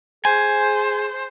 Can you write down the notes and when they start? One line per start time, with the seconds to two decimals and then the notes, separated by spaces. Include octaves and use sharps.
0.25 G#4 C5 G#5